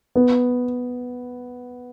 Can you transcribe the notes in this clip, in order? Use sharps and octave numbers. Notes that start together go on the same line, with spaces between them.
B3